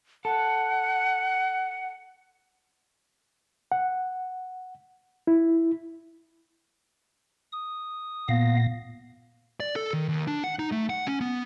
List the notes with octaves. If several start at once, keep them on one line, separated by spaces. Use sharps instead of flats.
A4 F#5
F#5
E4
D#6
A#2 B3 F5 A#6
D5
A4
D#3
D#2
D4
F#5
D#4
A3
F#5
C#4
B3